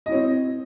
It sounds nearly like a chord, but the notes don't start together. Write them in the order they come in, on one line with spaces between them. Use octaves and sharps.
D#5 E4 C#5 C4